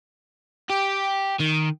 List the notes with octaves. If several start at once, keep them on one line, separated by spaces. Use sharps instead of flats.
G4
D#3